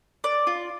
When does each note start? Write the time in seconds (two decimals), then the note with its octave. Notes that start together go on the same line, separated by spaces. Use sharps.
0.24 D5
0.47 F4